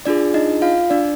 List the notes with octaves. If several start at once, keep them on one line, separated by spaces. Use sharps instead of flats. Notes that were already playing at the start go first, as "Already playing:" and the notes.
D4 F4 G#4 D5
D#4 D#5
F4 F5
D4 D5